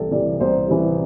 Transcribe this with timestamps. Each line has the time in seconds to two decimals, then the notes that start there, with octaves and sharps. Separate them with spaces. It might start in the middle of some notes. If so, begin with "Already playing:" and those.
Already playing: C2 C3 E3 G4 A4
0.11 C3 E3 D5
0.40 C2 C5
0.68 C3 E3